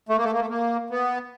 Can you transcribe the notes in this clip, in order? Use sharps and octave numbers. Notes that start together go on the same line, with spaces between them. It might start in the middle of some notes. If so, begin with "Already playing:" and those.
A3
A#3
A3
A#3
A3
A#3
B3